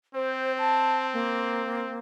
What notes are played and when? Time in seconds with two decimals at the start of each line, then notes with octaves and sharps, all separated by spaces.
0.14 C4 C5
0.58 A5
1.14 A#3